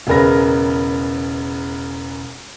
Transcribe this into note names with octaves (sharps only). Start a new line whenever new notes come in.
E1 C#3 G#4 A#4 B4 A#6